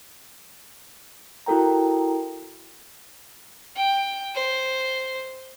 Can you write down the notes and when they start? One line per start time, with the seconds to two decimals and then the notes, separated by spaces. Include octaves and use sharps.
1.46 E4 F#4 A4 A#4 G5 A#5
3.76 G5
4.35 C5